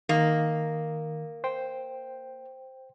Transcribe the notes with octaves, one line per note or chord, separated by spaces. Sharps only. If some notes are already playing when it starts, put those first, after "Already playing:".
D#3 A#3 D#6
C5 G5